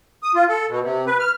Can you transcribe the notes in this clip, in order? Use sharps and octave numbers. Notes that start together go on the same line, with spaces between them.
D#6
F4
A4
B2
C3
B4
F6